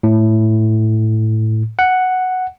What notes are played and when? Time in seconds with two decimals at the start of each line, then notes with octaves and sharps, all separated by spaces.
0.03 A2
1.79 F#5